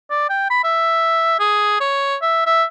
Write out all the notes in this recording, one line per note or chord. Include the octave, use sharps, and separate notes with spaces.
D5
G5
B5
E5
G#4
C#5
E5
E5